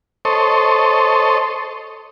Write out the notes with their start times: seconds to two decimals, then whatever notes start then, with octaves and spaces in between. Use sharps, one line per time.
0.25 A4 C5 C#5 D#5